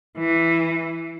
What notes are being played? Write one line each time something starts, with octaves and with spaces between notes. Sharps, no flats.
E3